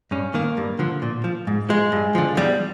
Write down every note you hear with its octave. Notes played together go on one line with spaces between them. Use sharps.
G2 C#4
D#3 A#3
G2
D3 F3
A#2
F3
G#2
F3 G#3
G2
D3 F3
E2 G3